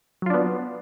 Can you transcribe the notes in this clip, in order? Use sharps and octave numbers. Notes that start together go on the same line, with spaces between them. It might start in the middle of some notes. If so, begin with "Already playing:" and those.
F#3 B3 D4 F4